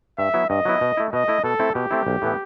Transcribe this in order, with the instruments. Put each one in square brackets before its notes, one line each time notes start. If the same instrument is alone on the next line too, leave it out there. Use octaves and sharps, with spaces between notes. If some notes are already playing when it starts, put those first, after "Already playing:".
[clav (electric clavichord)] G2 [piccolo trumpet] E5
[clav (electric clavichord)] F#3 B3 E4
[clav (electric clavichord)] G2 [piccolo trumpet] D#5
[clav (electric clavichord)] F#3 B3 E4
B2
A3 E4
[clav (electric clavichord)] B2 [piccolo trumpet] D#5
[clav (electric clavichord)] A3 E4
[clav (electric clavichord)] B2 [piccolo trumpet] A4
[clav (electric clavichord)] A3 C4 E4
[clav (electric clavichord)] B2 [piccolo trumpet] G4
[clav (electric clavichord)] A3 C4 E4
B1
A2 E3 B3